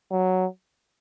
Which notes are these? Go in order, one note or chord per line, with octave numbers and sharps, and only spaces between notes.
F#3